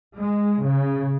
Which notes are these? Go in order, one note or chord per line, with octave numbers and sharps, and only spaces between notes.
G#3
C#3